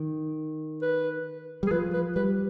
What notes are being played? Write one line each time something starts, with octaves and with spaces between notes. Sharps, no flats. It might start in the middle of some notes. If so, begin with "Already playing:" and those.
Already playing: D#3
B4
G3
G#4
F3 B4
B4
G3 B4